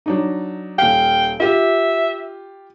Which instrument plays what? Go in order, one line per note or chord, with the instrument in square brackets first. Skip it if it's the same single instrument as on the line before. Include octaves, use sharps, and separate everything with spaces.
[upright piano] F#3 D4 D#4
[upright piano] D#1 F5 [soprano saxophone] G5
[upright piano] F4 G4 [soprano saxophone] E5